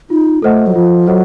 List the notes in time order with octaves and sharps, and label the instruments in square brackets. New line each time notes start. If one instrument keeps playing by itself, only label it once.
[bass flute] D#4 [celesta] F4
[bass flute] A3 [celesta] A4 C5 D#5 F#5
[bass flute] F#3
[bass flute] F3 [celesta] F4
[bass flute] F#3 [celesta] A4 C5 D#5 F#5